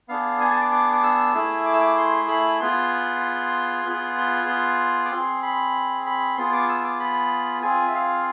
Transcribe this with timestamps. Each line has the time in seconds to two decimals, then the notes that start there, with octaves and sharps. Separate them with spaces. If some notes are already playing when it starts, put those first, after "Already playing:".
0.09 B3 D4 G#4 F5
0.40 G#5
0.51 A5
0.61 D6
0.72 D6
0.93 D6
1.03 E6
1.34 A3 E4 G#4
1.66 D6
1.73 E6
1.81 D6
1.97 C6
2.28 B5
2.60 B3 F4 G#4 C6
3.23 C6
3.85 B3 F4 G#4
4.18 C6
4.48 C6
5.05 D6
5.11 C4 G#4 C6
5.43 B5
6.06 B5
6.37 B3 F4 G#4 C6
6.53 D6
6.69 E6
6.84 D6
7.00 B5
7.62 C4 F4 G#4 G#5
7.88 E5
7.94 F5